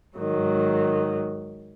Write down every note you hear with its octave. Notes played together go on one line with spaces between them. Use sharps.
G#2 D#3 F#3